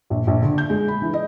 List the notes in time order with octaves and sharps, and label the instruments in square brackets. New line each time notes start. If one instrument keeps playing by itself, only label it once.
[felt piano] A#1
A#1
D3
G6
G#3
B5
E3
D#5